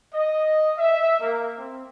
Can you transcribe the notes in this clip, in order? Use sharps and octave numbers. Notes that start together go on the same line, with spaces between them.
D#5
E5
A#3
C4